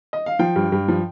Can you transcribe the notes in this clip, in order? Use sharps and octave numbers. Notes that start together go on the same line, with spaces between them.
D#5
F5
F3 G5
G2
G2
F3